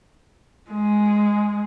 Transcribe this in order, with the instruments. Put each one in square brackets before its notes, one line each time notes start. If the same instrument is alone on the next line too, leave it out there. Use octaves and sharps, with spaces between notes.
[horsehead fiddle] G#3